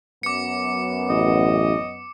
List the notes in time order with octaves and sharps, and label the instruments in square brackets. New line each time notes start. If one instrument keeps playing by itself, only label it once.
[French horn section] F#2 B3 [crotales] D6 C#7
[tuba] A1 [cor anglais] D#5